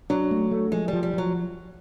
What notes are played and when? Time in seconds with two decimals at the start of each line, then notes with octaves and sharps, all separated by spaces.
0.10 F#3 D4
0.31 A3
0.51 A3
0.72 F3 G#3
0.88 G3
0.93 F3
1.03 G3
1.13 F3 F#3